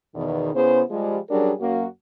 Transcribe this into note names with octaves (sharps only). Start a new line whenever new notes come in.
E2 B2 D#3
C#3 B3 E4 G#4 C5
F3 G3 G#3
F#3 G3 C#4 D4 G#4 A#4
F#2 A#3 F#4